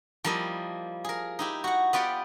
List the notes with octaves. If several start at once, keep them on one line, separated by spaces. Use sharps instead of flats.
F3 G3 A#3 E4 D#5
G#4 A#4
D#4 E4 G4
F#4 F#5
B3 F4 G4 D5 F#5